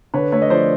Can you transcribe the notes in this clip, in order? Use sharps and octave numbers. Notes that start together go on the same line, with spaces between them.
D3 B4 C#5
A3 B4 C#5
D#5
F3 C5 D5